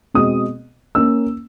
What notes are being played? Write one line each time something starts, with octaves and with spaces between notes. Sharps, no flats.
B2 G#3 C4 D#6
A#3 C#4 E6